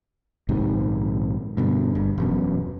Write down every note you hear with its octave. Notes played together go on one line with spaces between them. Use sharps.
A#1 G#2 C3 D#3
G2 B2 D3
G1 G2
E1 F#2 B2